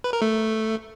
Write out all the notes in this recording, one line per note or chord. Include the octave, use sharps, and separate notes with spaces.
B4
A#4
A3